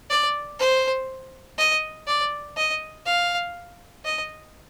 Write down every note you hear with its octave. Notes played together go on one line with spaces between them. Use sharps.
D5
C5
D#5
D5
D#5
F5
D#5